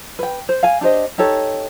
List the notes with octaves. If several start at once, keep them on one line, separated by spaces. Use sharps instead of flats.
B4 G5
C5
F5 G#5
D4 G4 C5 D#5
D#4 G4 A4 C#5